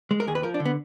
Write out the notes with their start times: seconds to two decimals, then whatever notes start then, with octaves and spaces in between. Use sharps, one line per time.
0.11 G#3
0.20 A#4
0.27 D#2 G#4
0.35 B4
0.43 F3 A#4
0.54 D4
0.60 D3
0.65 B3